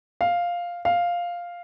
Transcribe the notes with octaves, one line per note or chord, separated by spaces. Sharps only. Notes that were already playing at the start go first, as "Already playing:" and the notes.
F5
F5